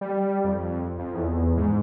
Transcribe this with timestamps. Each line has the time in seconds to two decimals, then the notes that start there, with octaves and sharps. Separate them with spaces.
0.01 G3
0.45 F2
0.99 F2
1.15 E2
1.57 G#2